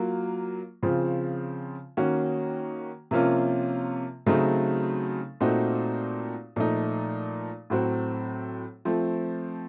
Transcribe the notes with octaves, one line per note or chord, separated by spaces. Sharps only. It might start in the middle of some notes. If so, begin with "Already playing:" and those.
Already playing: F#3 A#3 F4
C#3 F3 C4 F4
D#3 A#3 C#4 F#4
C3 F3 A#3 C#4 F4
C#3 F#3 A3 C4 D#4
A#2 A3 C4 D#4 F#4
A#2 F3 A3 D#4
A2 F#3 C4 F#4
F3 A3 C4